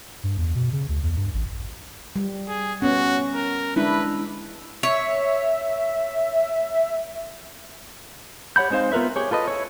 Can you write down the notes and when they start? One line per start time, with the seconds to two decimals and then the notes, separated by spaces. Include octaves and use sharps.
0.23 G2
0.37 E2
0.55 B2
0.72 C#3
0.89 D2
1.03 E2
1.17 G2
1.34 A1
2.16 G3
2.48 G#4
2.82 B3 C#4 F#4
3.35 A#4
3.76 G#3 D4 E4 B4
4.83 C#5 E5
8.56 G4 C#5 F#5 B5 G6
8.70 G#3 C4 D#4 C5 F5
8.92 B3 F4 A#4 B4 E5
9.16 G4 G#4 C#5
9.31 F4 A4 B4 D#5
9.48 E4 C#5